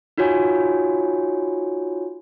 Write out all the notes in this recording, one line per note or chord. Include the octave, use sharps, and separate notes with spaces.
D#4 F4 F#4 C#5 G#5